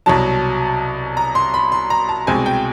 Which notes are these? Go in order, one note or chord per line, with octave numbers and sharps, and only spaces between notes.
C2 B2 F#3 A5
A#5
C6
B5
C6
A#5
A5
C2 B2 G#3 C4 G#5
G5